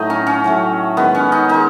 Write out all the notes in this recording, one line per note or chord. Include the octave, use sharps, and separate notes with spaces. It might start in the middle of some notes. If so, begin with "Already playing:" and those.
Already playing: A2 F#3 A3 D#4
C#4
C#4
A2 F#3 A3
D#3 G#3 B3
C#4
D#4
D#3 G#3 D#4